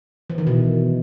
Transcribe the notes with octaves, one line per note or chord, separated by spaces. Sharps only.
E3
D#3
B2